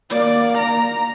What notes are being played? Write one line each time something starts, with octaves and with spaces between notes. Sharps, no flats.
A#3 D5
A#5